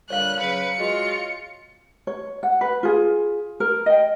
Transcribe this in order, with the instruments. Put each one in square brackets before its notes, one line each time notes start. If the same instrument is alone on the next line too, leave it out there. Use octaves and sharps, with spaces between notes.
[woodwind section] A#2 D3 G3 [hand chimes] C#5 F5 [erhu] F#6
[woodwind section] C#3 F#3 [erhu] B4 [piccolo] C#7
[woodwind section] G#3 F#4 [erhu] F4
[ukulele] C#5
F#5
B4
F4 G#4
A#4
D#5 G5